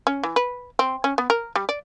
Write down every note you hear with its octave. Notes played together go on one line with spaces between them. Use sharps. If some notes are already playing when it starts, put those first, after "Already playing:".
C#4
E3
B4
C4
C#4
B3
A#4
G3
D5